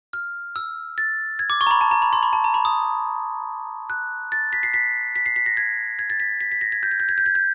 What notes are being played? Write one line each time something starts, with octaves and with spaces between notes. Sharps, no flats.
F6
E6
A6
G#6
D6
C#6
A#5
B5
A5
A#5
B5
C6
B5
A5
A#5
B5
D#6
F#6
A6
B6
C7
B6
B6
C7
B6
A#6
G#6
G#6
A6
B6
B6
B6
A#6
G#6
G6
G#6
G6
G#6
G6
G#6
G6